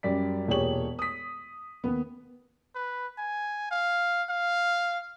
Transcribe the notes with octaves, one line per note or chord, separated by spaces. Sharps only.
F#2 G3 D5 B6
E1 A#2 G4 G#4 C#5 F#7
D#6 B6
D#2 B3
B4
G#5
F5
F5